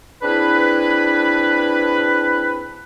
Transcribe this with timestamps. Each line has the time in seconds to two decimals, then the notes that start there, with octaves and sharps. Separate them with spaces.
0.22 C4 D4 E4 G#4 B4